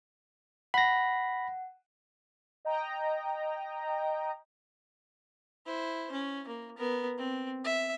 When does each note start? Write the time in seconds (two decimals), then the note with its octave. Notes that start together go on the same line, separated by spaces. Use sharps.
0.74 F#5 B5 A#6
2.65 D#5 G5 A#5
5.66 E4 C5
6.12 C#4
6.48 A#3
6.78 B3 A#4
7.18 C4
7.64 E5